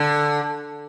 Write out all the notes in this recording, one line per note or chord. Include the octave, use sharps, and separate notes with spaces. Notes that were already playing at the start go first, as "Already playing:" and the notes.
Already playing: D3